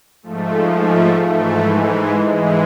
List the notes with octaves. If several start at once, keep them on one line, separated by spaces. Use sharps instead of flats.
G#2 F3 A3
A3
G#2 E3 A3
G#3
G#2 E3 G#3